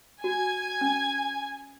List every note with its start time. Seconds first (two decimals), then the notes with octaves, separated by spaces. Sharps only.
0.24 F#4 G#5 G#6
0.81 C#4